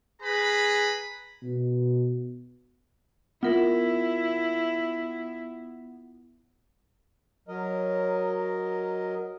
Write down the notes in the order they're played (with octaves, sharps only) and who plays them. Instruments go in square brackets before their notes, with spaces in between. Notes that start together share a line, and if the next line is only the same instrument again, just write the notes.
[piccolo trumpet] G#4 [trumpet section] B4 A#5 B5
[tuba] B2
[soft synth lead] B3 [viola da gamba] E4 [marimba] F4 A#4
[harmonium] F#3 A#4 D#5